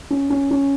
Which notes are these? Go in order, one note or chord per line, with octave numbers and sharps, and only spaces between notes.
C#4
C#4
C#4